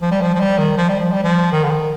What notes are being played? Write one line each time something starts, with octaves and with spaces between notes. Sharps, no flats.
F3
G3
F3
F3
G3
D#3
F3
G3
F3
G3
F3
D#3
D3
D#3